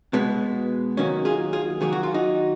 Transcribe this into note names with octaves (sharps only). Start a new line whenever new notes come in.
B2 G#3 B3
D#3 F#3 A#3 C#4
F4 G#4
F4 G#4
D#3 F#3 A#3 G#4
F#4
F4
D#4 F#4